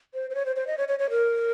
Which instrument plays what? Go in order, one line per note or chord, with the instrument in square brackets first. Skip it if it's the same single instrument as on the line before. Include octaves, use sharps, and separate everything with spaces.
[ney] C5
C5
C#5
C5
C5
D#5
C#5
C#5
C#5
A#4